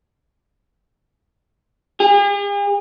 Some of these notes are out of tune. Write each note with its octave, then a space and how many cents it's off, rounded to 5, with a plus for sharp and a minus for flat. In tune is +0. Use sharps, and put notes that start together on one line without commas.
G#4 -45